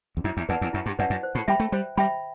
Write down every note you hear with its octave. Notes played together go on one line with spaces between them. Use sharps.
E2
F#2 E4
E2
E2 B4 D5 F#5 A5
E2
F#2 E4
G2
F#2 B4 D5 F#5 A5
F#2
C5
A2
G3 E5 G5 B5
A3
G3 C5
G3 E5 G5 B5